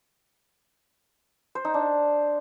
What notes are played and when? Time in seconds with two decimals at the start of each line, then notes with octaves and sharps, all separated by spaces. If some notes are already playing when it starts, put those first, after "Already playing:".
1.55 C5
1.65 D#4
1.74 D4